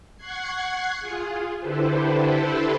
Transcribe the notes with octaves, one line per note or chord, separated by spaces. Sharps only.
F#5 C#6 F#6 G#6 C7
F4 G#4
D3 E4 G4 A4 B4 C5